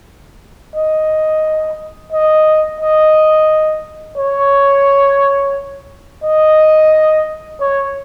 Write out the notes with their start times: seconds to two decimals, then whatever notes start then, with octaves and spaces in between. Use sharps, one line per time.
0.76 D#5
2.13 D#5
2.81 D#5
4.17 C#5
6.23 D#5
7.60 C#5